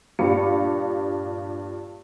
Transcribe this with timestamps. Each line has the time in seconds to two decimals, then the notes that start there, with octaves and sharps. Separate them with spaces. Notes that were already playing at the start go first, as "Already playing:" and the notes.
0.19 G2 A#2 G4 F5 C#7